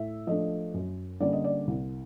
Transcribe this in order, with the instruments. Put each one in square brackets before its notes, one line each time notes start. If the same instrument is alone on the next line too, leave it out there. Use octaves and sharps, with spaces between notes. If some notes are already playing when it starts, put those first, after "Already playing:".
Already playing: [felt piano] A2 E5
F3 A3 D4 D#5
F#2
D3 G3 A#3 C#4 D5
D#5
D5
C2